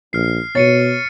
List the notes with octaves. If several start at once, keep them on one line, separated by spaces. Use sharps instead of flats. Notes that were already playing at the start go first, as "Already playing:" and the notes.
A#1 F6 C7
B2 C#5 A6 C#7 D#7